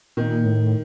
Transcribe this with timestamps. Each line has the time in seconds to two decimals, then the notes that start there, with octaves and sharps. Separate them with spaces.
0.17 A#2 D#3
0.45 A2